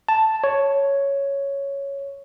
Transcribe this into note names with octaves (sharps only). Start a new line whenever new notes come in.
A5
C#5